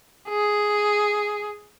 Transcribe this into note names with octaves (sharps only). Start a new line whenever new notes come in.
G#4